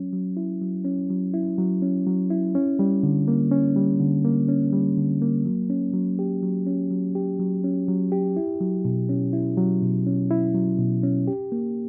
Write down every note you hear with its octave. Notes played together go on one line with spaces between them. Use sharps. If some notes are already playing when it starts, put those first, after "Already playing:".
Already playing: F#3 C#4
F#3
E4
F#3
C#4
F#3
E4
F#3
C#4
F#3
E4
C#4
G3
D3
A#3
C#4
G3
D3
A#3
C#4
G3
D3
A#3
F#3
C#4
F#3
G4
F#3
C#4
F#3
G4
F#3
C#4
F#3
G4
E4
F#3
B2
C#4
E4
F#3
B2
C#4
E4
F#3
B2
C#4
G4
A#3